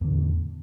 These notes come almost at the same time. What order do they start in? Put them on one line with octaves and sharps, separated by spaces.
E2 D3 A2